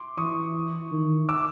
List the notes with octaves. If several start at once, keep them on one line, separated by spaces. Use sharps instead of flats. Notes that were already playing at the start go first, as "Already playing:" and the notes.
Already playing: C6 D6
E3 C#6 D#6
D#3
D6 E6